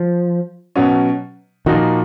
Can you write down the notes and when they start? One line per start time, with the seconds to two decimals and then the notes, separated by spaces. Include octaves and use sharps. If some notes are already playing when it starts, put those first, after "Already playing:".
Already playing: F3
0.76 B2 F#3 C#4
1.66 A#2 D#3 F3 A#3 D#4 F#4